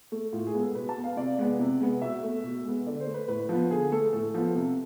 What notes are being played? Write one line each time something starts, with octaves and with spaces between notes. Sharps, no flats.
A3
A2 F4
G#4
G#3 B3
A4
B2 B4
A5
B3
F5
C3 D5
G#3 B3
C3
G#3 B3
B2 E5
A3
B2
G#3 B3
D3 D5
C5
A3
B4
A2 B4
F3 B3
D3 G#4
A3 A4
A2 A4
F3 B3
C3